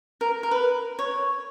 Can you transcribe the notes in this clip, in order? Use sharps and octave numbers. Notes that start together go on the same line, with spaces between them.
A#4
A#4
B4
C#5